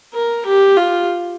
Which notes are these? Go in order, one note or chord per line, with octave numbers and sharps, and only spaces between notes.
A#4
G4
F4